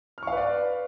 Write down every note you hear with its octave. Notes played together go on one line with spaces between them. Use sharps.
B4 D5 F5 C#6 F6